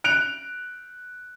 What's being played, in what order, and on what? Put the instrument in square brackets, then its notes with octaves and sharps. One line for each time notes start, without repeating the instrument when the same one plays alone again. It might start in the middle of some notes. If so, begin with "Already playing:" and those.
[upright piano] F#6 D7 F7